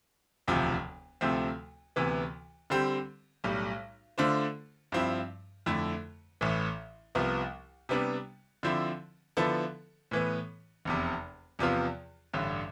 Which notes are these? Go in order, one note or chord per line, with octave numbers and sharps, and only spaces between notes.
E1 D2 C3 F3
D2 C3 F3 A3 C4
D2 C3 E3 B3
D3 G3 C4 G4
B1 A2 G3
D3 A3 D4 F4 C5
G2 F3 C4 E4
F2 D3 A3 E4
A1 A2 E3
C2 C3 F3 B3
C3 G3 B3 D4
D3 F3 C4 E4
D3 F3 B3 E4 A4
A2 E3 B3
F1 E2 C3
E2 C3 F3 B3 F4
A1 G2 D3